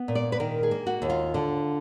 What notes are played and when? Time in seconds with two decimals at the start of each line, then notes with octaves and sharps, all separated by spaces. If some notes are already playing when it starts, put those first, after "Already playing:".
Already playing: B3
0.08 A#2
0.15 D5
0.32 B4
0.40 D#3 A#4
0.63 G#4
0.71 A#3
0.86 F#4
1.02 D#2
1.10 F4
1.34 D3